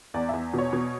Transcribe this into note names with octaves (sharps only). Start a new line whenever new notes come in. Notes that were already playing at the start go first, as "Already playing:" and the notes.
E2 D5
E2 E5
B2 C#5
B2